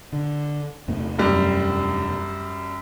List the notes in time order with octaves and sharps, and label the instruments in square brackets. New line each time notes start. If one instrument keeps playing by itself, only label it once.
[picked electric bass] D3
E2 C3 A3
[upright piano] F#2 G3